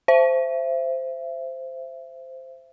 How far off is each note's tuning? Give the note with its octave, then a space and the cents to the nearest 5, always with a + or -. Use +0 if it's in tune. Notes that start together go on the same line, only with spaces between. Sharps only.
C5 -5 E5 +30